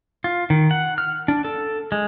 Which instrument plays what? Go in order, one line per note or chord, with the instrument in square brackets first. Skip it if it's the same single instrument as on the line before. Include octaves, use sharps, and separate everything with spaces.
[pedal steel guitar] F4
D#3
F#5
F6
D4
A4
G#3